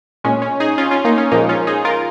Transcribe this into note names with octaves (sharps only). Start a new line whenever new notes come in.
A#2 G#3 C#4
C#4
D#4 G#4
C#4 F4
C#4 F4
A#3 D#4
C#4
A#2 F3 G#3 A#3 D#4
C#4 F4
D#4 G#4
F4 A#4